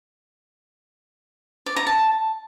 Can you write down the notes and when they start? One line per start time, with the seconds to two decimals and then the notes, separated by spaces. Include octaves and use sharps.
1.66 D5
1.76 A#5
1.87 A5